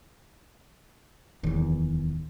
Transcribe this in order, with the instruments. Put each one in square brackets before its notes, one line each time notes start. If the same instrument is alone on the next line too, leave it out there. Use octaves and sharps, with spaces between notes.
[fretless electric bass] D1 E2 [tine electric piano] D#3